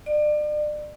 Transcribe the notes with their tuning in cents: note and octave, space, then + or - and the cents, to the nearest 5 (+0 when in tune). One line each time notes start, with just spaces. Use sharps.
D5 +35